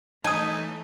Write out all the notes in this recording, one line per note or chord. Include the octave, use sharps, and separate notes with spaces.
E3 A3 D#4 G#5 A5 D#6